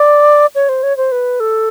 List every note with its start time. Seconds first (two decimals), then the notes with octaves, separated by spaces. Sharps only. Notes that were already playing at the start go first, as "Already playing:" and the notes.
Already playing: D5
0.55 C#5
0.69 C5
0.83 C#5
0.97 C5
1.12 B4
1.40 A4